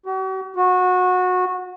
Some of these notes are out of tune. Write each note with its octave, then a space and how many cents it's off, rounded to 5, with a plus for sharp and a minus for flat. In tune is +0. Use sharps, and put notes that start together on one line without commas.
F#4 +45
F#4 -20